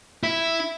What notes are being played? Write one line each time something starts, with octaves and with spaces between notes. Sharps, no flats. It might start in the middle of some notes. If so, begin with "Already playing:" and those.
E4